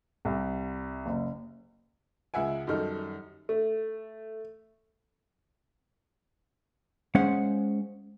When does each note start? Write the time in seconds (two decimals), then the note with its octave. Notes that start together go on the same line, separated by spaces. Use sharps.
0.25 C2
1.06 F#1
2.34 C#2 G#3 E5 F#5 G#5
2.67 F#2 D#3 G3 D#4 A4 F6
3.49 A3
7.15 G#3 C#4 G#4 C5 F5 F#5